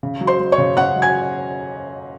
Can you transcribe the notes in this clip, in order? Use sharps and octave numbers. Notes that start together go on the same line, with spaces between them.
C#3
F#3
C5 C6
F#3
C#5 C#6
C#3
C#3 F#5 F#6
F#3
G#5 G#6